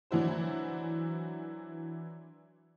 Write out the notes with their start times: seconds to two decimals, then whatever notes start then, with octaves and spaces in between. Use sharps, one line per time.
0.11 E3 F#3 D4 E4 F#4 C5